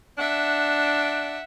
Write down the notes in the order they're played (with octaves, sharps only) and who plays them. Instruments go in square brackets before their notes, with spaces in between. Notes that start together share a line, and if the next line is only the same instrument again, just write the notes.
[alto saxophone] D4 [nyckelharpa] E5 F#5